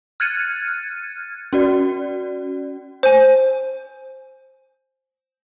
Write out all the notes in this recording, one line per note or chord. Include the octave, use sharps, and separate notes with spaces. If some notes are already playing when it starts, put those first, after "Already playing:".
F6 F#6 G#6 A6 C#7 D#7
C#4 F#4 D5
C5 G#5